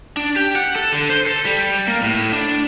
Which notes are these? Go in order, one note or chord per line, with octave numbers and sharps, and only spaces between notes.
D4
G4
F#5
A4
D3
C5
A4
G3
A#3
A2
D4